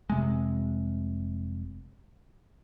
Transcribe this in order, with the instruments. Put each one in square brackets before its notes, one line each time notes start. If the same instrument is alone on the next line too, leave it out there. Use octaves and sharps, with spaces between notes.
[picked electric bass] F1 C3 G#3